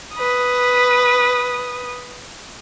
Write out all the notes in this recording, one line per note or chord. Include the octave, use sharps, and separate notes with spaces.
B4 D#6